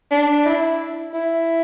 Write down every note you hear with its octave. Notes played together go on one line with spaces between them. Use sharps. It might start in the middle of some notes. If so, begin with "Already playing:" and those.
D4
E4
E4